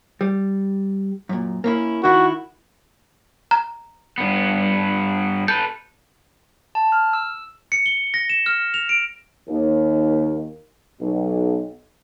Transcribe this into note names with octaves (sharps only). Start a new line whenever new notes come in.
G3
F#2 A#2
A#3 C#4 E4
D#3 E4 F#4
A#5
G2 B3
A4 B4 G6
A5
F6
E6
C#7
G7
A#6
E7
F6
F7
D7
D#2
B1